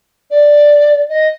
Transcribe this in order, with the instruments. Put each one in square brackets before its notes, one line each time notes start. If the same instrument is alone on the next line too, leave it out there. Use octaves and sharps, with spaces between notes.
[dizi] D5
D#5